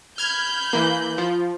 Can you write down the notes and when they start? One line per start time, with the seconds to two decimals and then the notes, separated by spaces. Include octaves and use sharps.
0.18 B5 F6 G6 G#6
0.73 E3 A#3
1.18 F3